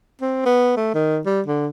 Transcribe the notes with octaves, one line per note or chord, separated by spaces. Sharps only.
C4
B3
A3
D#3
G3
D3